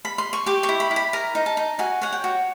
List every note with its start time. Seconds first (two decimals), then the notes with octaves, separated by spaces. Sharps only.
0.05 B5
0.18 C6
0.33 C#6
0.46 G4 D6
0.63 C#6
0.69 E4
0.80 B5
0.91 E4
0.96 B5
1.13 A#4 A#5
1.35 D#4
1.46 A5
1.57 D#4
1.79 F#4 G#5
2.02 C#5 F#5
2.13 G5
2.24 F#4